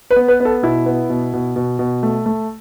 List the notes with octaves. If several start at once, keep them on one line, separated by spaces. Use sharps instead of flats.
B4
B3
B4
B3
A4
B2 E4
B3
B2
B2
B2
B2
A3
A3